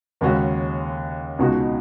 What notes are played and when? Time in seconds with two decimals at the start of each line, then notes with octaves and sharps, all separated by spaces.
0.21 D#2 C#3 G#3 C#4 F#4
1.39 C#2 B2 G#3 D#4 F#4